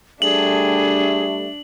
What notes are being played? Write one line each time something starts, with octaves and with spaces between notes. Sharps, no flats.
G3 A3 D4 G#4 F#7